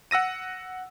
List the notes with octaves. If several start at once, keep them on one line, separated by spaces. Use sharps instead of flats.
F#5 E6 A#6 D#7